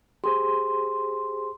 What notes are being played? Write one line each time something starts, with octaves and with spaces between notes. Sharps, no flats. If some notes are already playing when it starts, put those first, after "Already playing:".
G4 G#4 C5 C6